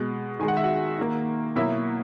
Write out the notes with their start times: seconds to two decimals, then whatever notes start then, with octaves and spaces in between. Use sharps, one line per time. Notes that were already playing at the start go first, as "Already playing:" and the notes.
Already playing: B2 G#3
0.40 D#3 G#3 G#5
0.48 F#5
0.57 E5
0.64 F#4 F#5
0.98 D#3 A#3
1.56 B2 F#3 A#3 E4 E5